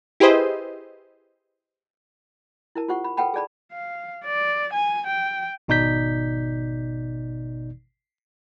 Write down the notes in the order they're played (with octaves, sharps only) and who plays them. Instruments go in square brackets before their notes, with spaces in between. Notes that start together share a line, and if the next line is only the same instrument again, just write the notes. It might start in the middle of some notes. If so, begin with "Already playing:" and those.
[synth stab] E4 G4 G#4 B4 C5 D#5
[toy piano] E4 A#4 A5
F4 G4 C5 F#5 C#6
B5
A4 B4 F#5 G5 A5 B5
G#4 A4 D5 A5 B5
[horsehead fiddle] F5
D5
G#5
G5
[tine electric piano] G#1 B2 D#4 D5 G6 B6